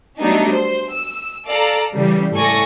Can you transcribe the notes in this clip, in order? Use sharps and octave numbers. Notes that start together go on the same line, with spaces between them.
F#3 G3 A3 B3 D4 D#4
C5
E6
A4 D5 F5 A#5
C#3 E3 G3
A2 A4 D5 G#5 C#6 A#6